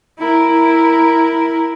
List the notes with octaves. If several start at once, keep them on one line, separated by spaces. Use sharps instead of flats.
E4 A#4